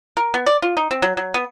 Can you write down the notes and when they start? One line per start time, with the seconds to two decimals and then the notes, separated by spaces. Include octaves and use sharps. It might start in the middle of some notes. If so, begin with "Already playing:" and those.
0.17 A#4
0.34 B3
0.46 D5
0.62 F4
0.77 D#4
0.91 C4
1.02 F#3
1.17 F#3
1.34 B3